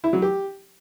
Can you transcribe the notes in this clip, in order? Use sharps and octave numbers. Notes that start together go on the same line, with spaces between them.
E4
F#3
G4